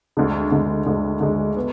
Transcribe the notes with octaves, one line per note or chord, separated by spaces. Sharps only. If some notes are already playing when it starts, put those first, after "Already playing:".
D2 D3 G#3
D2 D3 G#3
D2 D3 G#3
D2 D3 G#3
B3